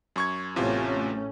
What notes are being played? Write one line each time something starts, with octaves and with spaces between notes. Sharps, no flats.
F#2 C#6 G#6
A1 E2 C3 A3 C#4 F4